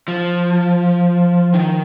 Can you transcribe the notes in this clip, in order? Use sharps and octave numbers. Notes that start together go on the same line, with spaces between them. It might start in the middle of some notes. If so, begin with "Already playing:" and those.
F3
D#3